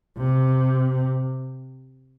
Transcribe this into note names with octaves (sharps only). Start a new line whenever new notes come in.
C3